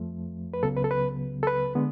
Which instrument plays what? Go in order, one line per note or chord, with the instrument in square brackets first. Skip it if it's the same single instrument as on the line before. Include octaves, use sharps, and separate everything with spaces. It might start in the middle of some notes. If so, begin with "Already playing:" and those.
Already playing: [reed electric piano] F2 F3 A3
B4
C#2 C#3 F#3 B3 A4
B4
A4
B4
A4
B4
D3 G#3 B3